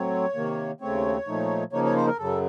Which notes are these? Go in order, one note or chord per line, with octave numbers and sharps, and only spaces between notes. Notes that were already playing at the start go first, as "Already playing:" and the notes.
Already playing: A2 F#3 C4 C#5
C3 D#3 A#3
D#2 C#3 A3 C4 C#5
A#2 F3 A3 D#4
C#3 F3 A#3 D#4 C#5
C#5
C5
A#4
F#2 C#3 F#3 A4